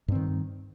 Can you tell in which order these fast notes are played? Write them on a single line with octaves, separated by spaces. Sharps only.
G2 C4 D#3